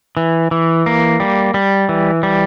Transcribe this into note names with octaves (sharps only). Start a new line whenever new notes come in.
E3
E3
A#3
G3
G3
E3
G3